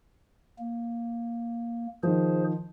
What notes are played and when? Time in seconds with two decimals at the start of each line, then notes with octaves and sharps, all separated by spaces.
0.59 A#3
2.03 D#3 F3 G#4 C5